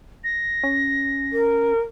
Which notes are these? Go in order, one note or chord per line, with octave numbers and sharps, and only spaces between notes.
A#6
C#4
A#4